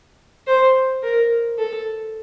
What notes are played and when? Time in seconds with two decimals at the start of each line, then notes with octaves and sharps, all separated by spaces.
0.47 C5
1.03 A#4
1.58 A4